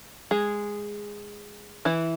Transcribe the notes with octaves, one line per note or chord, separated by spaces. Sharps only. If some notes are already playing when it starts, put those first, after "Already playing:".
G#3 G#4
E3 E4